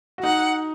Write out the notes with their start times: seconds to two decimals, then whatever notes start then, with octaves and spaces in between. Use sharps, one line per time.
0.18 F#4
0.23 D#4 F#5